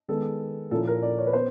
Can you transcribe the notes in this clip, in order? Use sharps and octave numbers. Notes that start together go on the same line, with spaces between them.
D#3 G#3 B3 A4
A#2 F3 A#3 C#4 E4 A4
A#4
D5
C#5
B4
B3 C5